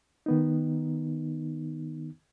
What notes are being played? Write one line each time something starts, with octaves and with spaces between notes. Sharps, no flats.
D#3 B3 D#4